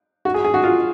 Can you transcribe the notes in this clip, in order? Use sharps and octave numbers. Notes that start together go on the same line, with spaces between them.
F#4
G#4
G#4
F#4
F4